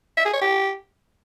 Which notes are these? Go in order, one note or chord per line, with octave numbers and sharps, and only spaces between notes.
E5
G#4
C#5
G4